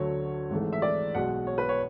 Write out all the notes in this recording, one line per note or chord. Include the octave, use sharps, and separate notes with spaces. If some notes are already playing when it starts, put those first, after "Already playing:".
Already playing: D2 D3 F#3 A3 C#5
G#1 G#2 E3 A3
E5
D5
B1 B2 G#3 F#5
C#5
B4
C#5